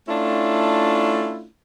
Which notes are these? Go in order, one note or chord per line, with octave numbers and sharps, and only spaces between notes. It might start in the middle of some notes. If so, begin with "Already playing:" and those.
A3 C#4 D4 E4 F4